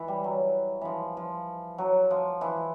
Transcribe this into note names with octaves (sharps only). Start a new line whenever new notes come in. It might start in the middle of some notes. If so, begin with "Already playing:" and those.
Already playing: E3
G3
F#3
E3 F3
F3
F#3
F3
E3